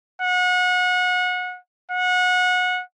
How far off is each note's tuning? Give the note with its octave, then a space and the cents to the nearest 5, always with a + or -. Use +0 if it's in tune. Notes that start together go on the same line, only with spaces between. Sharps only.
F#5 -30
F#5 -25